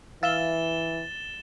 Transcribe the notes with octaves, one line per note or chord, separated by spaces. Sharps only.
E3 E5 F5 A6 E7 G7